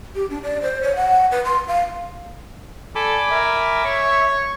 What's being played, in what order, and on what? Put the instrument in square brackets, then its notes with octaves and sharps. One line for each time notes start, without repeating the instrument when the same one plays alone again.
[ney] G4
D4
D5
C5
C#5
F#5
B4
C6
F5
[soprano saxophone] A4 [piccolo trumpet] D5 [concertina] G#5 B5 D6
[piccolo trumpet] A#4 [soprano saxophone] E5
[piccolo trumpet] C#5 [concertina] C#6